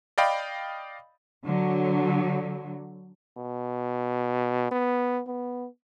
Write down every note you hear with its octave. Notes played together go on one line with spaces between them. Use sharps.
D5 D#5 F5 G5 B5
D3 F#3
B2
B3
B3